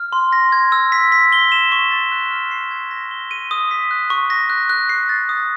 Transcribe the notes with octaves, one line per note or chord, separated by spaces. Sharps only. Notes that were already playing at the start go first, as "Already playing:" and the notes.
Already playing: F6
C6
A#6
G#6
E6
B6
B6
G7
E7
C#6
A6
F#6
F6
C7
G#6
A#6
G7
D#7
D#6
B6
F#6
C#6
A#6
F#6
F#6
C7
A6
D#6